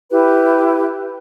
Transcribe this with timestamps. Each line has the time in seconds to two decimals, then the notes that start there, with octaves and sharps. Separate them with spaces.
0.11 E4 G4 B4